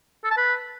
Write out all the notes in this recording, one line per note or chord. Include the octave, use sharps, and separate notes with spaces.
A4
A5
B4